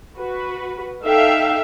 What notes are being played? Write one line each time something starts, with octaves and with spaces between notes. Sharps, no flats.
F#4 B4
D#4 A4 E5 F5 G5